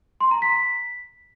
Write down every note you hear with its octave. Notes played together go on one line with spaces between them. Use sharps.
C6
A#5
B6